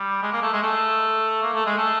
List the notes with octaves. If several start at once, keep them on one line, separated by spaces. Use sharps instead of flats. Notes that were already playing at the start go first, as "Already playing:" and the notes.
Already playing: G3
G#3
A#3
A3
G#3
A3
A#3
A3
G#3
A3